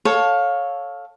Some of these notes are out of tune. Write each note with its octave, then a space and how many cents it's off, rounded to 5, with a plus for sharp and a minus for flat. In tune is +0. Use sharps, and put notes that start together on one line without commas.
A4 +0 C#5 +0 F5 +20